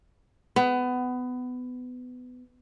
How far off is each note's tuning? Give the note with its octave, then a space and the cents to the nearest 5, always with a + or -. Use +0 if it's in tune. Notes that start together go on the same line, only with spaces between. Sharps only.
B3 +20